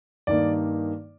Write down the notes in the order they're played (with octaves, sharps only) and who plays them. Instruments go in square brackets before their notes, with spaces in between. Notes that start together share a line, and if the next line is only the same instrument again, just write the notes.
[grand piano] G2 D#3 A#3 D#4 D5